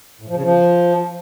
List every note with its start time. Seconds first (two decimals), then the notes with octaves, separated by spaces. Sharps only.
0.21 A2
0.28 F3
0.35 C#3
0.42 F3